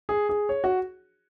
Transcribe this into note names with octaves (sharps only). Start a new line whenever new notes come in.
G#4
G#4
C#5
F#4